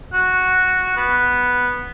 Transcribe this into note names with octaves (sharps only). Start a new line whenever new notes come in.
F#4
B3